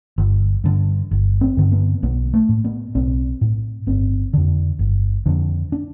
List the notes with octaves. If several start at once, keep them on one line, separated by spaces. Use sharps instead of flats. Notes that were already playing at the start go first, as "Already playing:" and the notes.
G1
G2 D3
G1
C4
G2 D3
B3
B1 B3
A3
A2
B3
B1 C4
A2
G1 C4
F2 D3
G1
F2 D3
D4